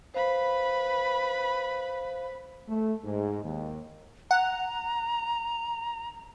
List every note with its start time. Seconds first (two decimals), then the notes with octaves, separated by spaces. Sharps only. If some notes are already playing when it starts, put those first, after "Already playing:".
0.14 B4 C5 F5 B5
2.68 A3
3.04 G#2
3.44 D#2
4.31 F#5 A#5